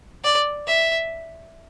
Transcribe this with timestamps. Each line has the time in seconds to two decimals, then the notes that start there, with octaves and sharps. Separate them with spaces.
0.24 D5
0.67 E5